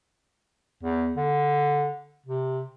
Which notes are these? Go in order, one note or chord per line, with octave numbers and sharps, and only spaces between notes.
E2
D3
C3